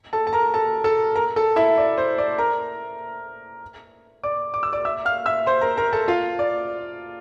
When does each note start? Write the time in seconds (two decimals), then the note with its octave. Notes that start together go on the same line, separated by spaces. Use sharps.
0.13 A4 A5
0.27 A5
0.33 A#4 A#5
0.54 A4 A5
0.84 A4 A5
1.15 A#4 A#5
1.36 A4 A5
1.56 E4 E5
1.78 D5
1.98 C5
2.18 D5
2.38 A#4 A#5
4.23 D5 D6
4.54 D6
4.63 E6
4.73 D5 D6
4.85 E5 E6
5.05 F5 F6
5.26 E5 E6
5.46 C5 C6
5.61 A#4 A#5
5.77 A#4 A#5
5.93 A4 A5
6.08 F4 F5
6.39 D5